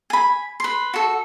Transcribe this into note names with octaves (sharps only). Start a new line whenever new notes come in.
G#5 B5
B4 C6
F#4 A4